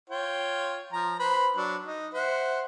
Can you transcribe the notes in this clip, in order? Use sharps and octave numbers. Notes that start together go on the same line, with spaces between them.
F4 C#5 G5
F3 A#5
B4 C5 B5
F#3 D4
D#4
C5 E5 F#5